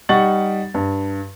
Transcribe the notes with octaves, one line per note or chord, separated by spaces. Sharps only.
G3 D#4 F#5 C#6 A6 F#7
G2